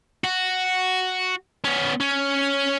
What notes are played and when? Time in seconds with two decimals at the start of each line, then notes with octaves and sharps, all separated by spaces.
0.24 F#4
1.65 B3 C#4
2.01 C#4